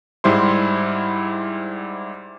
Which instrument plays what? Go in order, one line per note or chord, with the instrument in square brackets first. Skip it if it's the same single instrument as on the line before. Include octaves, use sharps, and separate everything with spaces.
[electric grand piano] G#2 G3 E4 C5 C6